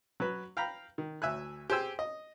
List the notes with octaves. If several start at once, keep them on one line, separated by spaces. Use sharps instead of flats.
F#3 B4
F5 G5 A#5 B5
D#3
D2 E5 G#5 F#6
G4 G#4 C5 G#5 E6
D#5